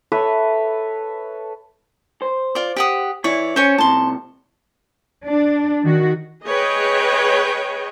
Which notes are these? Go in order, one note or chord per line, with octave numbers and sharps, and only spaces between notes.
A4 B4 C#5 E5
C5
F4 D5
G4 F#5 D#6
E3 E4 C#5 D5
C#4 C5 C#5 G#5
A2 C3 A5 C6
D4
D#3 F#4
G#4 B4 C#5 D#5 G5